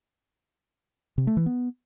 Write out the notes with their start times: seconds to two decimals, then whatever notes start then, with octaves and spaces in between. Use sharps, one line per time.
1.18 C3
1.27 A3
1.37 E3
1.46 B3